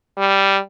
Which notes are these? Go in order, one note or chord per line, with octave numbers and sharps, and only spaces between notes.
G3